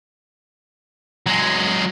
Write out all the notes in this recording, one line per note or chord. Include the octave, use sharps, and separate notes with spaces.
F#3 G#3